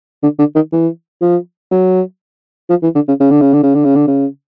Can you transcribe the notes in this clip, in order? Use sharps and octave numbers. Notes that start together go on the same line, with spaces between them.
D3
D3
D#3
E3
F3
F#3
F3
E3
D3
C#3
C#3
D3
C#3
D3
C#3
D3
C#3
D3
C#3